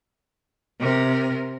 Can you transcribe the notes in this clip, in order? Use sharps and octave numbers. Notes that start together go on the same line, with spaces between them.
C3 A#4